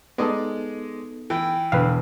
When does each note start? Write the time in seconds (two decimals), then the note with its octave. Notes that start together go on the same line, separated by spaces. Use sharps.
0.18 G#3 B3 D#4 A4 D5 D#5
1.30 E3 G5
1.72 E1 D3 B4 F5